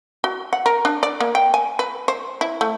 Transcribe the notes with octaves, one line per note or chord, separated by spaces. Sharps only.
F#4
F#5
A#4
D4
D5
A#3
G5
G#5
B4
C5
E4
A3